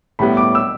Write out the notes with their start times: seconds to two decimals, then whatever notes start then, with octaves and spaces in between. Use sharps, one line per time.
0.19 A2 G3 B3 B5
0.37 D6
0.55 E6